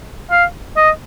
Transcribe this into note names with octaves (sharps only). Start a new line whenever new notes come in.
F5
D#5